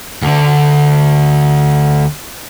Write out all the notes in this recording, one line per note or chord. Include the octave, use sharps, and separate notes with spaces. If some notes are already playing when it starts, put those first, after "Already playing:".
D2 D3